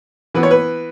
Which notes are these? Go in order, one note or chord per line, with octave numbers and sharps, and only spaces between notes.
E3 B3 B4
C#5
B4